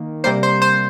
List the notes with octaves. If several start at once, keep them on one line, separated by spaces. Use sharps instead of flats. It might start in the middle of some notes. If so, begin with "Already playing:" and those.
Already playing: D#3 A#3
C3 G3 A#3 C5
C5
C5